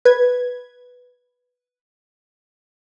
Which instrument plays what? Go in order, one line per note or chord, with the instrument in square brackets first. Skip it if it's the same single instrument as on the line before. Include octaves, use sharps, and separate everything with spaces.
[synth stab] B4 G#6